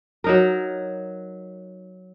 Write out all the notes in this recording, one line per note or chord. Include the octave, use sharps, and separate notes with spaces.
F#3 D#4 A#4